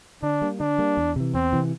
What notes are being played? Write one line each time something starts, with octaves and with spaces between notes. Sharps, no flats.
D3 D4
G3 A#3
D3 D4
G3 A#3
E2
C3 E3
E2 C4
C3 E3